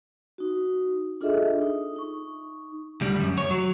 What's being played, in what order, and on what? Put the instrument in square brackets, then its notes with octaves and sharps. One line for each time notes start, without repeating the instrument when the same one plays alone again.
[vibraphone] D#4 F#4
D4 F4 G#4 A4 D#5 E5
D#4
D#4 C#6
[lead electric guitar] D2 G3
F#2
C#5
F#3